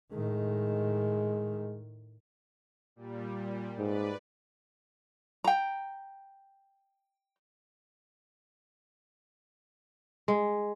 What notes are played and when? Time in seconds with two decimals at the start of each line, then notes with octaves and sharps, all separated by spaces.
0.13 A2 D#3 G#3
2.96 A#2 G3
3.79 G#2 B4 D5
5.44 G5 A#5
10.28 G#3